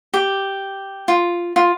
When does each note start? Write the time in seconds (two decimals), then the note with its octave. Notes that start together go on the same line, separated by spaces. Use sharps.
0.14 G4
1.08 F4
1.56 F4